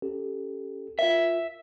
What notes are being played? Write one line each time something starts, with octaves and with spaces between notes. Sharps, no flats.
C#4 G4 A4
F4 A#4 E5